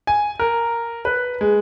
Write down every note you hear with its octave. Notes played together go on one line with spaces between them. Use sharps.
G#5
A#4
B4
G#3